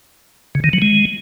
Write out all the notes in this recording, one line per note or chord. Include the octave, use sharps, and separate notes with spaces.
C#3
D#3
F#3
G#3